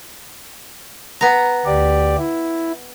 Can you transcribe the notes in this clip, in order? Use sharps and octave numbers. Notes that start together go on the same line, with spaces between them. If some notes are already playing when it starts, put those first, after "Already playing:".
B3 A#5
D2 G4 D5
E4